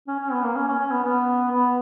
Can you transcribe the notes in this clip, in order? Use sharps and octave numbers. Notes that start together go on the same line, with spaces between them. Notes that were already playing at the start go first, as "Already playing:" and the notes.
C#4
C#4
B3
A#3
C#4
C#4
C#4
B3
B3
B3